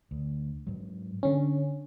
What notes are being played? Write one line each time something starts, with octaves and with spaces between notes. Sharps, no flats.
D2
G#2 F#3
D3 C#4 D4